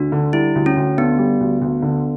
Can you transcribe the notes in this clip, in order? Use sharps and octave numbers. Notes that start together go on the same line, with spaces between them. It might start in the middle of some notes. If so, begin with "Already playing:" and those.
Already playing: D2 D4
D3
G3 E4
D2
C#4
D2
D3 B3
G3
D2
D2
D3